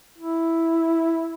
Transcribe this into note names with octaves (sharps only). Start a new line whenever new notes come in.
E4